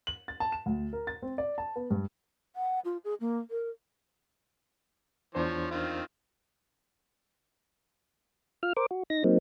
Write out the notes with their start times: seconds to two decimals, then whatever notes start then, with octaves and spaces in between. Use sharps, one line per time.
0.07 F#7
0.28 A6
0.40 A5
0.52 E7
0.66 D2
0.93 A#4
1.07 A6
1.22 C4
1.38 D5
1.58 A5
1.76 B3
1.90 G2
2.56 F#5
2.85 F4
3.04 G#4
3.20 A#3
3.50 A#4
5.35 E2 F3 D4 C5 C#5
5.71 D#3 C4 F4
8.63 F4 F6
8.76 A#4 C5 D6
8.91 F#4
9.10 D#4 A#6
9.24 F#3 A#3 C4 D#4